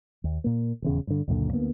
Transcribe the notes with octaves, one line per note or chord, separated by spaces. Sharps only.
D#2
A#2 A#3
D#1 E2 C#3
G2 D3
C#2 F#2 A#2 D3
D2 A#3 B3